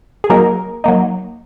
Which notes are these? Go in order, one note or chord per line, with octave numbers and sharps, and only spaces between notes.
G#4
F#3 A#3 D#4 A#4
F#3 A#3 D#4